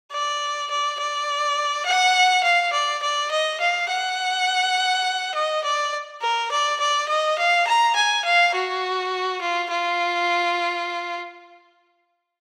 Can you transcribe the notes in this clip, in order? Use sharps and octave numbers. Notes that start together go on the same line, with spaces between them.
D5
D5
D5
F#5
F5
D5
D5
D#5
F5
F#5
D#5
D5
A#4
D5
D5
D#5
F5
A#5
G#5
F5
F#4
F4
F4